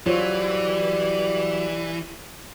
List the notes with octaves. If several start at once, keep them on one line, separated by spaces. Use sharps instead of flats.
E3 F#3 G3 F4 C5 C#5